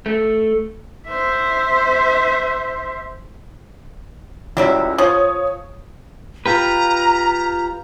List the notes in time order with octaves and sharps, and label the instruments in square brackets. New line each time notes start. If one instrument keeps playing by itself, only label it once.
[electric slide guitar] A3
[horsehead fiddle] C5 E5
[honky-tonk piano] C#2 [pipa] F#3 G3 E4
[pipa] F3 [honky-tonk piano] C#5 D#6
[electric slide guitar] F4 G4 B4 [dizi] A#5